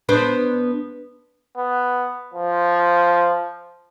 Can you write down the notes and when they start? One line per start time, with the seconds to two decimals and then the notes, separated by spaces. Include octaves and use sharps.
0.09 B3 D4 C5
1.57 B3
2.34 F3